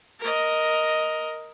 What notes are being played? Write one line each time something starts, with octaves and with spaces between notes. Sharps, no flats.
A#4 D#5